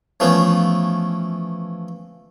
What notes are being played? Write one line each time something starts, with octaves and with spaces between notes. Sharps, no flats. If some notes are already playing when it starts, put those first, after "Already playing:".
E3 F3 A3 B3 C#4